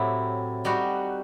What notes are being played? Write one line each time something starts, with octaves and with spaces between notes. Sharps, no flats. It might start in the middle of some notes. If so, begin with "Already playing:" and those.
Already playing: A2 F#3 C4 E4 G4
G3 D#4 F#4